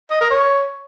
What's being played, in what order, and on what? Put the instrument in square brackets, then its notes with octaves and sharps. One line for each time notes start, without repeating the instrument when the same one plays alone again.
[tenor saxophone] D#5
A#4
C#5